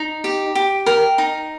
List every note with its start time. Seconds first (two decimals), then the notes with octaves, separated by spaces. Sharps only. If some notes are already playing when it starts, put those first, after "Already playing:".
Already playing: D#4
0.24 G4
0.55 G4
0.86 A#4 G5
1.18 D#4